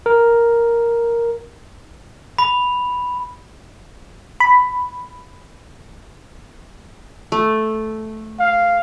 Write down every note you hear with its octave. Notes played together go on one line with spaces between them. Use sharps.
A#4
B5
B5
A3
F5